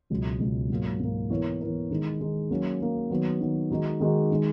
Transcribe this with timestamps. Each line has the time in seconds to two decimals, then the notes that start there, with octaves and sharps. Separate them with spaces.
0.10 C#2 B2 F#3
0.40 C#2 B2 F#3
0.70 G#2 F#3 A#3
1.00 G#2 F#3 A#3
1.30 E3 B3 E4 A#4 C#5
1.60 E3 B3 E4 A#4 C#5
1.91 D#3 G#3 D#4
2.20 D#3 G#3 D#4
2.50 F#3 A#3 C#4
2.81 F#3 A#3 C#4
3.10 D#3 F#3 B3
3.40 D#3 F#3 B3
3.71 D#3 G#3 D#4 F#4
4.00 D#3 G#3 D#4 F#4
4.31 D#3 G#3